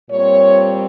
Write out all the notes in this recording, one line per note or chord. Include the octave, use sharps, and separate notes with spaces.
A#2 G3 C4 C#5